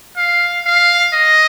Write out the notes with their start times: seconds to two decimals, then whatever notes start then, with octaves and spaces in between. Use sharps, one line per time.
0.17 F5
0.66 F5
1.14 D#5